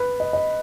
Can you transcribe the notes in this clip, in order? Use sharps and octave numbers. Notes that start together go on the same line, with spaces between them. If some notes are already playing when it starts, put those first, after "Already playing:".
Already playing: B4
D#5
D#5